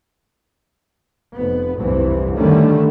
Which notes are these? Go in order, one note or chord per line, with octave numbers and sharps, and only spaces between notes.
F1 B3
F1 C2 G2 E3
D3 D#3 G3 A3 C#4